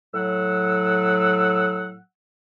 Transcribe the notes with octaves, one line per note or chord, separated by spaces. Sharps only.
A2 F#3 F#5 E6